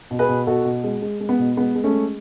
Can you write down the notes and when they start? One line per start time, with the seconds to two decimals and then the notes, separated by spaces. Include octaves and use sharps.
0.11 B2
0.19 G#4 B4
0.29 B2
0.47 B2 F#4 A4
0.65 B2
0.84 G#3
1.02 G#3
1.21 G#3
1.29 B3
1.39 B2
1.57 G#3 B3
1.75 G#3
1.84 A3 C#4
1.94 G#3